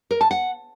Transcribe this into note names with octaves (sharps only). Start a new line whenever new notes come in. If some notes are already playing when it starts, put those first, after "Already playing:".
A#4
A5
F#5